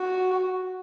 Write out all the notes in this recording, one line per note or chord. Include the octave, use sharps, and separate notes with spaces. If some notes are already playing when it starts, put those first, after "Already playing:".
Already playing: F#4